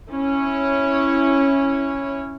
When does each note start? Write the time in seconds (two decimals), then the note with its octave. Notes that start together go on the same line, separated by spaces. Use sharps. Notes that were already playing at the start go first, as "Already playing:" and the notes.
0.11 C#4 E4 C#5